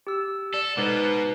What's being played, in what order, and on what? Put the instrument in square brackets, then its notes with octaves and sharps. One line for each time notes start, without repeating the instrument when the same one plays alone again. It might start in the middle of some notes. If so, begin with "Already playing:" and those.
[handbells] G4 E6
[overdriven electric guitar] A4 [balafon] D5
[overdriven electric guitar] B2 [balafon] G#3 A4 C5 [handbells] D#4 B4 D6